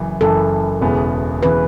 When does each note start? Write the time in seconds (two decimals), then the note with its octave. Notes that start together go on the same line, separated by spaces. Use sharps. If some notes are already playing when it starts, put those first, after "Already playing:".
Already playing: F#1 F#2 E3
0.21 F#1 F#2 E3 A4
0.81 E1 E2 C#3 E3 B3
1.43 C#3 E3 B3 B4